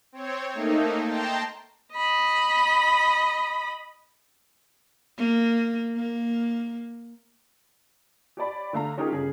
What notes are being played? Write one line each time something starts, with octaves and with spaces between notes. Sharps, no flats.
C4 C#5
A3 A#3 D#4
G5 A5 A#5 C6
D#5 B5
A#3
A#3
G4 C#5 D5 B5
D3 A3 F5 A#5
C#4 D#4 F4 G4 G#4 A#4
G1 C#3 G#4